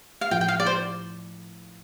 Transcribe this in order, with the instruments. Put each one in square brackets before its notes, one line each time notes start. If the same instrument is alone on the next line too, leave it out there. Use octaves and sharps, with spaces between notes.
[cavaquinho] F5
[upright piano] A2 F3 A3 [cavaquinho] G5
[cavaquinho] G5
F5
D5
C5